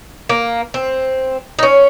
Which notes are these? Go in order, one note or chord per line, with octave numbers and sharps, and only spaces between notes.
A#3
C4
D#4
C#4